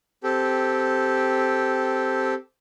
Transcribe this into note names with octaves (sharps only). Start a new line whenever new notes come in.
C4 G4 A4